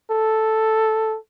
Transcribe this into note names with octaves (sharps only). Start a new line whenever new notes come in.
A4